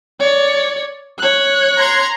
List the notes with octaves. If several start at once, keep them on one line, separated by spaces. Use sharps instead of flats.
C#5 D5
C#5 F#6
A#5 C6 G#6